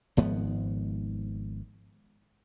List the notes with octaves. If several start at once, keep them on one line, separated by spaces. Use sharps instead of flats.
G#1 G#2 F3 B3